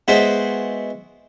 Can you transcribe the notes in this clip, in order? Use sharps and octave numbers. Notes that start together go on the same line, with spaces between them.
G#3 B3 E4 F#4 B4 C5